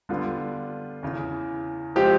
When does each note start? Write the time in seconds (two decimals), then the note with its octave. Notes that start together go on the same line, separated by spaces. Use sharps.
0.09 D3 G3 B3 D4 F4
1.03 E2 C#3 E3
1.96 F3 G#3 C4 G4